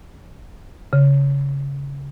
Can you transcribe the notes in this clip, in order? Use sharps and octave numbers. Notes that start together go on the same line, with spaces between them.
C#3